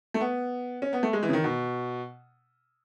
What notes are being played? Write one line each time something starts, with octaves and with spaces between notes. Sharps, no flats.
A3
B3
C#4
B3
A3
G#3
E3
C#3
D#3
B2